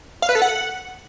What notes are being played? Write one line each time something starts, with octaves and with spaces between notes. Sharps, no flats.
F5
B4
A4
F#5